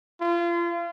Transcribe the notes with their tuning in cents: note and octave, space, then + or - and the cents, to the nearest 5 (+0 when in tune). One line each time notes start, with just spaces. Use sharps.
F4 -30